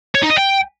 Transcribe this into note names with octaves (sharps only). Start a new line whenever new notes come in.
C#5
D#4
D#5
G5